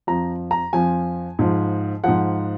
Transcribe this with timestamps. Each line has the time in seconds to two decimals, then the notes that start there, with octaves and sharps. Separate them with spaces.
0.07 F2 F3 A#5
0.51 A#5
0.73 F2 F3 G#5
1.39 G#2 F3
2.04 G#2 F3 F#5